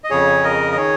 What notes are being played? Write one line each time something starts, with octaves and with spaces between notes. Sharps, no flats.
D#5
F2 C#3 G#4 C#5
A#4 D#5
D#5
D#3 G#4 C#5